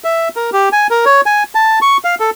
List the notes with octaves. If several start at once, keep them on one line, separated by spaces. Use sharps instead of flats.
E5
A#4
G4
G#5
A#4
C#5
G#5
A5
C#6
F5
A4